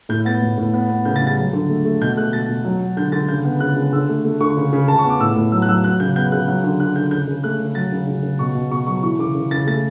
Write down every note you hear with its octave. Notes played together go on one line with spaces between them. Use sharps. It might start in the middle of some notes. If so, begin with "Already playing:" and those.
A2 G6
B3 A6
A2
A2
B3
B3
C#3 G6
A6
G3
A6
F#3
D3
A3
A3
B2 G6
A3 F#6
B2 A6
B2
F#3
F#3
D3 G6
D3 A6
C#3 G6
B3
C#3 F#6
C#3
D3 E6
A3
A3
D3 C#6
C#3
C#3
C#3 A5
C#6
B3
D6
A2 E6
A2
F#3 E6
F#6
F#3 E6
F#3 F#6
C#3 G6
B3 G6
C#3 F#6
F#3 F#6
D3
D3 F#6
D3 G6
C#3 G6
C#3
A3 F#6
C#3
F#3 A6
C#3
C#3
C#3
B2 C#6
B2
B2 C#6
F#3 C#6
E3 C#6
C#3 D6
C#3
C#3 A6
A3 A6